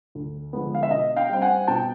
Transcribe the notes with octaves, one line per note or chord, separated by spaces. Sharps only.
D2
D3 F3 G#3 B3
F5
E5
B2 D#5
F5 G5
G3 C4 G5
F#5 G#5
B2 G5 A5